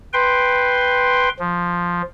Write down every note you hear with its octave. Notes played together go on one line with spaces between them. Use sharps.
B4 G5 C6
F3